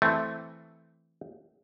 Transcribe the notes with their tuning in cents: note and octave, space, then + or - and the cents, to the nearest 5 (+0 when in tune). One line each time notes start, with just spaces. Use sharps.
E3 +0 A3 +0 C4 +0